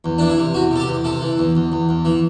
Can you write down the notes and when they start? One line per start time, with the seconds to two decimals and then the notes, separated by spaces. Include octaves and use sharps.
0.04 E2
0.18 E3 D4
0.30 E4
0.38 C3
0.54 E2 F#4
0.71 C3 A4
0.80 G4
0.87 E2
1.04 C3 A4
1.22 E3
1.38 E2
1.55 E2
1.72 E2
1.89 E2
2.05 E3